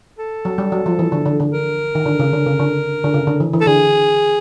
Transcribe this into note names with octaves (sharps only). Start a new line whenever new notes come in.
A4
F#3
G3
F#3
F3
E3
D3
D3
D3
A#4
D#3
D3
C#3
D3
C#3
D3
D3
C#3
D3
E3
E3
A4
D3 G#4